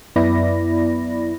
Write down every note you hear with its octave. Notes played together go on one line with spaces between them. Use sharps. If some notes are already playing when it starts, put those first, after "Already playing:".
F#2 B3 E4 D5 B5 A#6